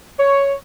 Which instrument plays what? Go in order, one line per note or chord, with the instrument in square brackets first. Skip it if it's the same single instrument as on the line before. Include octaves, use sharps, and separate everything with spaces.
[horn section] C#5